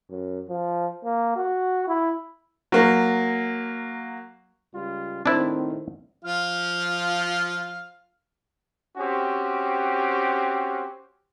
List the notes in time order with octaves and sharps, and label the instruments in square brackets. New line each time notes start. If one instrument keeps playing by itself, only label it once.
[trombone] F#2
F3
A#3
F#4
E4
[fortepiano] F#3 A#3
[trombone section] C#2 G3 F4
[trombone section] A2 D#3 [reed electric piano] C4 C5 [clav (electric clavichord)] D4 E4
[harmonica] F3 F4 F5
[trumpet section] C4 C#4 F#4 G4